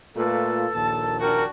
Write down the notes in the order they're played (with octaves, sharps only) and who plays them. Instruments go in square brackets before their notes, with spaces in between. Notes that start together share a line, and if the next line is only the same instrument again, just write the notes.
[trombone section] A#2 A3 F4 [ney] A4 [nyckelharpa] B4
[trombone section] A#1 D#2 A#2 [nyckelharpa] A5
[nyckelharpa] D4 F#4 [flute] A#4 [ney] G5